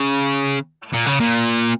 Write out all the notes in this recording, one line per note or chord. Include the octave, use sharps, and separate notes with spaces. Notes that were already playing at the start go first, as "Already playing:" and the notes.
Already playing: C#3
A#2
C#3
A#2